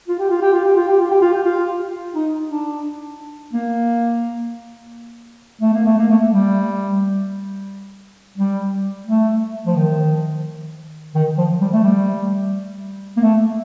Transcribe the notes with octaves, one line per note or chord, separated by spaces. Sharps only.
F4
G4
F4
G4
F4
G4
F4
G4
F4
G4
F4
G4
F4
D#4
D4
A#3
A3
A#3
A3
A#3
A3
G3
G3
A3
F3
D#3
D#3
F3
G3
A3
G3
A#3
A3